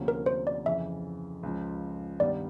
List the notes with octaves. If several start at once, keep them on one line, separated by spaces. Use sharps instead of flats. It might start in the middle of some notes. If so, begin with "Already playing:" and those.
Already playing: D2 C3 F3 A#3 C#4
A#4
C5
D5
F2 C#3 E3 E5
C#2 C#3 F3
G2 D#3 G3 B3 D5